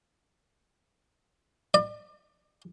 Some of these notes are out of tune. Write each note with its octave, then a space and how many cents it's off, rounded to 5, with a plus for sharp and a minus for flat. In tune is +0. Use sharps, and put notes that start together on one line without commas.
D5 +35